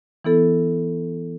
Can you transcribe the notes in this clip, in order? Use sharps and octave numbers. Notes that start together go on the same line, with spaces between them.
E3 B3 E4 A4